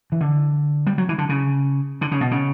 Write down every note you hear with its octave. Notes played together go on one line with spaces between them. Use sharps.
E3
D3
G3
F#3
E3
D3
C#3
D3
C#3
B2
C#3